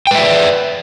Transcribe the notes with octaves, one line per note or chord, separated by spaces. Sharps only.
B4 D5 E5 G5